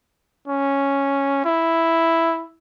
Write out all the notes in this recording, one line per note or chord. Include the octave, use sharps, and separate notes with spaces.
C#4
E4